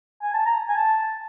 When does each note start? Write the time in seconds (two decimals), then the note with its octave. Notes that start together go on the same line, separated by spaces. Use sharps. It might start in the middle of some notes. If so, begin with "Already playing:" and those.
0.23 G#5
0.34 A5
0.46 A#5
0.69 G#5
0.76 A5